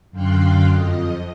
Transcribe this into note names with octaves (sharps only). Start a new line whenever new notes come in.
F#2 D3 F5 G5 C6 F#6
F2 D#5